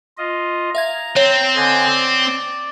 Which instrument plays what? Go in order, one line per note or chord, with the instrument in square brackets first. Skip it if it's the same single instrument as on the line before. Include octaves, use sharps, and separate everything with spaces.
[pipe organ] F4 D#5
[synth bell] E5 F5 G#6 [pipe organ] A#5
[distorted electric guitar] C4 [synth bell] C#5
[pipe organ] D3 D#5 G#5
D5